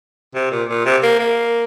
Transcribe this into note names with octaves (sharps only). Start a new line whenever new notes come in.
C3
A#2
A#2
C3
A#3
A#3